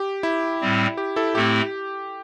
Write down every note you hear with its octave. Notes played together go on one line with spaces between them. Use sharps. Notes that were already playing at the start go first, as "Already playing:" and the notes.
Already playing: G4
E4
A2 G3 C4
G4
E4 A4
A2 A3 C4 E4 G4